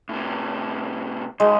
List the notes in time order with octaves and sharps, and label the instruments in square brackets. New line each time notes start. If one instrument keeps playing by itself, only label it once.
[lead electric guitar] A2 C3
[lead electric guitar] B1 [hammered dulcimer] G#3